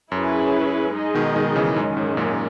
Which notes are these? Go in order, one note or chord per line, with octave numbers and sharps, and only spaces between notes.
F#2 C#4 E4 G#4 B4
G#3 D#4 G#4 D#5
B2 D#3
B2 D#3
C#3 E3
F#2 D#3 G#3 C#4
G#2
F#2 A#2